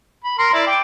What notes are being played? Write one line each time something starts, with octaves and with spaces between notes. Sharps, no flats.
B5
A#4 C6
E4 D5
G5 D6